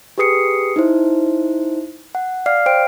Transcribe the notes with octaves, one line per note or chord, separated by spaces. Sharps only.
G4 G#4 B4 D#6 C7 C#7
D#4 E4 C5
F#5
D5 F5 F6 C7
C5 G5 D7